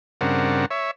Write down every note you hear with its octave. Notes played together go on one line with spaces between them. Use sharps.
G2 C#3 C4 D4 A#4 F#5
C#5 E5